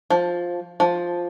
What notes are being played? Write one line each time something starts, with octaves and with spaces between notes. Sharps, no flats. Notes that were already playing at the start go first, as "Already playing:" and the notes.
F3
F3